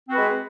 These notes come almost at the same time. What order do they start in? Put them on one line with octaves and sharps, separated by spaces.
C4 F#4 B4 G#3